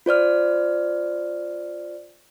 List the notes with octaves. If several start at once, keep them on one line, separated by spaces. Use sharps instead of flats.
F4 C5 D5 F6